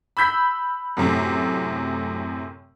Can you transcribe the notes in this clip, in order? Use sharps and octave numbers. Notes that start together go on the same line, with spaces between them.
B5 E6 G6 B6
F#2 A2 C3